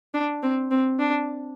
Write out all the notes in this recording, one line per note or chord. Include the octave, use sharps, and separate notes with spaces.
D4
C4
C4
D4